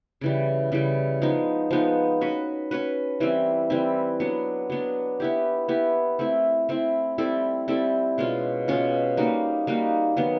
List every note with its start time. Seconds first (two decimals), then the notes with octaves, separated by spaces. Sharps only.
0.21 C#3 E3 G3
0.72 C#3 E3 G3
1.22 F3 G#3 B3 D#4
1.71 F3 G#3 B3 D#4
2.21 C#4 F#4 B4
2.71 C#4 F#4 B4
3.20 E3 G3 C4 E4
3.70 E3 G3 C4 E4
4.20 F#3 B3 D4
4.70 F#3 B3 D4
5.20 B3 E4 G4
5.68 B3 E4 G4
6.19 A3 C4 E4
6.69 A3 C4 E4
7.18 G3 C4 E4 A4
7.68 G3 C4 E4 A4
8.18 B2 G#3 C#4 F4
8.68 B2 G#3 C#4 F4
9.17 G3 A#3 D#4 F#4
9.67 G3 A#3 D#4 F#4
10.17 D#3 F#3 B3